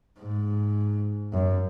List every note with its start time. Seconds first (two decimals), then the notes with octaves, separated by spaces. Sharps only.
0.20 G#2
1.33 F#2